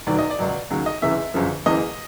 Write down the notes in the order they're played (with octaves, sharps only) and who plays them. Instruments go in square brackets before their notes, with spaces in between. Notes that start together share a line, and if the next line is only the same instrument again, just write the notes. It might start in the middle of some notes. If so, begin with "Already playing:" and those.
[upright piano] E1 D#2 D#3 F#3 D5
D#5
D5
C#2 B2 F#3
D#2 C#3 F#3
D#5
F1 E2 C#3 E3 E5
G1 F#2 C#3 F3
F#1 E2 C#3 E3 D#5